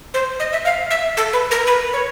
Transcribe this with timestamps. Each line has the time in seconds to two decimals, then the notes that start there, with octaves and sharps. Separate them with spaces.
0.14 C5
0.40 D#5
0.52 E5
0.65 F5
0.90 E5
1.17 A4
1.33 B4
1.51 A#4
1.67 B4
1.93 C#5